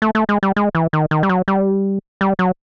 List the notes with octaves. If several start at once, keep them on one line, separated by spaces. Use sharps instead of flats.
A3
A3
G#3
G3
G#3
E3
D#3
D#3
G3
F#3
G3
G3
F#3